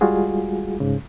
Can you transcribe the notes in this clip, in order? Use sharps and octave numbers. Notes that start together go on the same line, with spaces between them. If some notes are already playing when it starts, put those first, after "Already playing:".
G3 G#3 F4 F#4 G#4
G#2 C#3